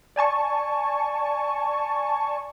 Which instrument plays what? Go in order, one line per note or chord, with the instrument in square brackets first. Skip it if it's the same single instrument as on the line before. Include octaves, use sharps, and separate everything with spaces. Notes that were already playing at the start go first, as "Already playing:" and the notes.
[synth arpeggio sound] D5 G#5 A5 C#6